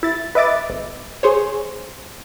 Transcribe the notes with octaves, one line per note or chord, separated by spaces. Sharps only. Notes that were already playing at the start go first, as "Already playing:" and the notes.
E4 A6
B4 D#5 E5 D6 A6
G#1
G#4 C5 C#5